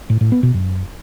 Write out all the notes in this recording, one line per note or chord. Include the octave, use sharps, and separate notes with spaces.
A2
A2
B3
B2
F#2